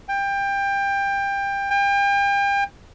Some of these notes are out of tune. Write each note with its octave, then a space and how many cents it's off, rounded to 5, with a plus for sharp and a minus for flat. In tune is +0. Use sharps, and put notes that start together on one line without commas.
G5 +20
G5 +35